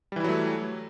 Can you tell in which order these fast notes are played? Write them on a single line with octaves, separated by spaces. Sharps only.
G3 E3 E4 F#3 A3